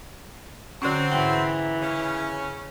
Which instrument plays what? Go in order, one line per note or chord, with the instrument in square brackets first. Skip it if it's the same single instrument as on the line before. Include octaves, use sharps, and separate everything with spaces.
[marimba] D3 C#4 [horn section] F#3 C4
[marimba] G#2 G5 [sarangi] E3
[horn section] C#3 C#4